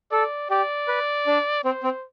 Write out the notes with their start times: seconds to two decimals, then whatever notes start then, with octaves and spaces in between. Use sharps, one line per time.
0.11 A4 D5
0.50 G4 D5
0.88 B4
1.27 D4
1.64 C4 C5
1.83 C4